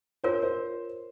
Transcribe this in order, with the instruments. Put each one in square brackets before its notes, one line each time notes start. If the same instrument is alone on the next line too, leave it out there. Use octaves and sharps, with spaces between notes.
[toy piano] F4 A#4 C#5 [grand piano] C5
[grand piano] C5